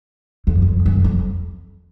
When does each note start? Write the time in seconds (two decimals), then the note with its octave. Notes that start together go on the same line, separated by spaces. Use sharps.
0.47 F2
0.62 F2
0.86 F#2
1.04 F2